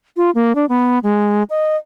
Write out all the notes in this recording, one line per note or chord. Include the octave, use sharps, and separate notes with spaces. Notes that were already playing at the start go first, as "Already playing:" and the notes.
F4
A#3
D4
B3
G#3
D#5